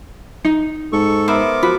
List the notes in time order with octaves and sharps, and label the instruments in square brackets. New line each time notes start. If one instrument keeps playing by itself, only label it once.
[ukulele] D#4
[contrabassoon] G#2 [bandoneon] A4 C#6
[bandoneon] B3 A#4 D6 [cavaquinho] C5 E5 B5
[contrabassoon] F3 [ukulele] F#4 [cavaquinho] B5